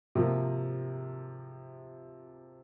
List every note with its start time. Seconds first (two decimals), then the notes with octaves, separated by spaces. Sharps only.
0.15 C3 F3 A#3